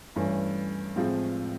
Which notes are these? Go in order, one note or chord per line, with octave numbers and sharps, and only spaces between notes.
G2 E3 A3 C#4
A2 F3 G#3 C4 F4